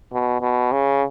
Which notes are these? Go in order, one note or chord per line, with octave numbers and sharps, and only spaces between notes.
B2
B2
C#3